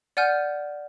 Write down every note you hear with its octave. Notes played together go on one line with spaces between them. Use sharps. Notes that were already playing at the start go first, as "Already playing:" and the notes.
D5 F#5 G#5 F6 G6